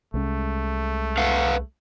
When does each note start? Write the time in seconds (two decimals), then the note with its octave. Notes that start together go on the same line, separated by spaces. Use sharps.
0.14 C2 G#3 A3 C#4
1.17 B4 F5 F#5